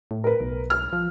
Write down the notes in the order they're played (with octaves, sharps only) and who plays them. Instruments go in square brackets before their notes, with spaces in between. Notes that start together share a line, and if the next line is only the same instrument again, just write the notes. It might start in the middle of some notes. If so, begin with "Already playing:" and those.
[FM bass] A2
[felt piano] A#4 B4
[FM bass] B1
[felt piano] F6
[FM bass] F3